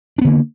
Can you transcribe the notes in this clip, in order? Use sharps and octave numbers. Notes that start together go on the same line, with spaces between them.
D3 A#3 B3 D4